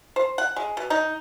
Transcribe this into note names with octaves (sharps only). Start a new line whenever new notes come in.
C5
F#5
G#3
B2
D#4